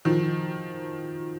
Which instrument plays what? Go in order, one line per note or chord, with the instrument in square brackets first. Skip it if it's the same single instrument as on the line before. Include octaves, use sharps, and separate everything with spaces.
[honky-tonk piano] D#3 F3